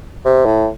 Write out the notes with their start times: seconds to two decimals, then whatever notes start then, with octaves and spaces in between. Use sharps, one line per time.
0.25 C3
0.46 A2